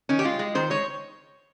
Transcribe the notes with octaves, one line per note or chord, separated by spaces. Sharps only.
D#3 C#4
G4
G#3 F4
G#3
D#3 C5
G#3 C#5